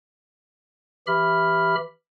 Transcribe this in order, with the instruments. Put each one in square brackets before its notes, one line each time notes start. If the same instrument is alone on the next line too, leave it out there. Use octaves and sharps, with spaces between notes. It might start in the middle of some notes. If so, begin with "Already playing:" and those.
[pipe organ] E3 G4 E5 B5 F6